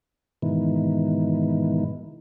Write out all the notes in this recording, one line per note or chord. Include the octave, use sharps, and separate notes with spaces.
G#2 B2 D#3 E3